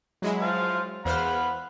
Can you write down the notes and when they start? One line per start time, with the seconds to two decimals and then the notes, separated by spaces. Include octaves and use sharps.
0.22 F#3 G#3 E4
0.42 C5 F5 A5
1.05 E2 C5 F5 F#5 B5 F6